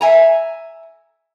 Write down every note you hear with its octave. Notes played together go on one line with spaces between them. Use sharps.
E5 G#5 A#5